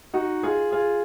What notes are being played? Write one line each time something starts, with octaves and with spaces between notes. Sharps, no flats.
D#4 F#4
F4 G#4
F4 G#4